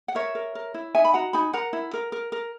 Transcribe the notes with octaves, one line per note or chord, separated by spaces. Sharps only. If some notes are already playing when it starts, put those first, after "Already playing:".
F#5
A#4 C#5 E5
A#4
A#4
E4
D#4 E5 G#5
B5
F#4 F#5 A#5
D#4 G#5 B5
A#4 F#5 A#5
E4
A#4
A#4
A#4